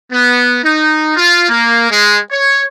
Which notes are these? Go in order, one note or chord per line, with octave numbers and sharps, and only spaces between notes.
B3
D#4
F4
A#3
G#3
C#5